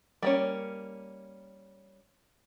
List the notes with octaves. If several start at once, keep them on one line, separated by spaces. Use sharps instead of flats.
G3 A#3 C#4